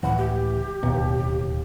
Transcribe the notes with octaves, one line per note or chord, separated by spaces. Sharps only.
C#2 A2 E3 F#5
G4
D1 D#2 B2